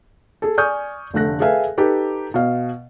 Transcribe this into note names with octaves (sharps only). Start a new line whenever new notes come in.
G#4 A4
D5 G#5 C#6 D#6 F6 G6
F1 D3 A3 F#6 A#6
G#4 A4 B4 E5 F5 G#5
D#4 G4 A4 B4
B2 F5